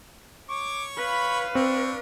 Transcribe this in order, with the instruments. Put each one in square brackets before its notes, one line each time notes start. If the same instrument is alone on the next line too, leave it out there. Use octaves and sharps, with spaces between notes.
[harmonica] C#5 C#6 [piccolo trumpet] D6
[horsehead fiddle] B4 F5 [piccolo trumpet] B5
[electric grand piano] C4 [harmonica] D4 [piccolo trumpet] C#6